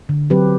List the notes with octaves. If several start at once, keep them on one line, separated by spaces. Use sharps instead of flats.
D3
F#3 C4 G4 B4